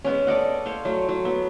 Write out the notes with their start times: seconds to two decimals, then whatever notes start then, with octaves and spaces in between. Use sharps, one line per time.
0.04 G#3 B3 C#4
0.27 A4 D5 D#5 F#5
0.66 C5 C#5 F5
0.85 F#3 A3
1.09 F#3
1.25 B3